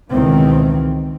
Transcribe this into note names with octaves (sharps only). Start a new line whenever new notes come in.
C#2 B2 D#3 E3 C4